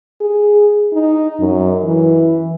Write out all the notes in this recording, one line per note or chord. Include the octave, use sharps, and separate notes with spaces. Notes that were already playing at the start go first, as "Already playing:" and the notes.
G#4
D#4
F#2
E3